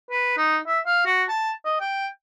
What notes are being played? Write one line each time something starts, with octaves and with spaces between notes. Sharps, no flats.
B4
D#4
E5
F5
F#4
A5
D#5
G5